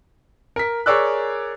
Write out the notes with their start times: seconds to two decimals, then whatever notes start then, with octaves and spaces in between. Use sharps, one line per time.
0.56 A#4 B6
0.86 G#4 A#4 C#5 D5 E6 F#6